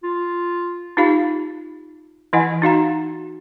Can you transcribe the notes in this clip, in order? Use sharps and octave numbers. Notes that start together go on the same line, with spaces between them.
F4
D#4 F4 G4 F5 B5
E3 E4 D#5 F#5 G#5
D#4 F#4 F5 A#5